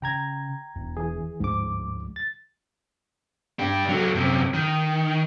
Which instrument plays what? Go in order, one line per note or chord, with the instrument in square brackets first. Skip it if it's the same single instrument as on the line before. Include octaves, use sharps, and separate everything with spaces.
[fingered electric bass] C#3 [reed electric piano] G5 A#5 G#6
[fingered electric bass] E1 E2
[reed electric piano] E3 G#4
[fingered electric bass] D2 F3 G#3 [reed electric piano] G#2 D6
[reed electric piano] A6
[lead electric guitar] D4 G4
F#3 A3
F#2 C3
D#3